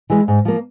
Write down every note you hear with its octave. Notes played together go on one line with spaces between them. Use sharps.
E3 G#3
G#2
F3 A#3